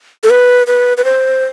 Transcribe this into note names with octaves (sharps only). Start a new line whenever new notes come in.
A4
B4
B4
B4
C5